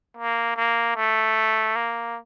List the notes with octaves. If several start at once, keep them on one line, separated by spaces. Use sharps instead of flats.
A#3
A#3
A3
A#3